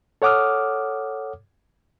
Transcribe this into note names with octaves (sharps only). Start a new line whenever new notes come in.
A4 C#5 F#5 D6 D#6 F6